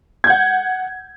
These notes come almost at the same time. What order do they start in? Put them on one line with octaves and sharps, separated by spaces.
G#6 G6 F#5